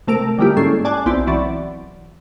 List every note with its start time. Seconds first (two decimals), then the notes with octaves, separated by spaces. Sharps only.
0.07 C3 A3 A#4 D7
0.38 D3 G3 G#3 A#3 E4 G4
0.57 G#2 C#4 A4 C7
0.85 D5 G#5 A5 D6 F#6
1.06 B1 C4 E4 D5
1.27 E3 F#3 D5 A6